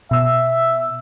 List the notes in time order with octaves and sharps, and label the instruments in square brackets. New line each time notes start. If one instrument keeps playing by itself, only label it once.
[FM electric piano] B2 E6 [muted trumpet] E5